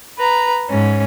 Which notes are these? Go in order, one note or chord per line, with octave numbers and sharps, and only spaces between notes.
B4 A#5
G#2 C#4